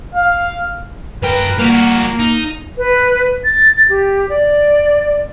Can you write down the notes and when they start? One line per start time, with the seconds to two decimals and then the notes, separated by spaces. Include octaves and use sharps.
0.15 F5
1.23 F#2 A#4 B4 G5
1.58 G3 A#3 F#4
2.19 D#4
2.78 B4
3.44 A6
3.89 G4
4.29 D5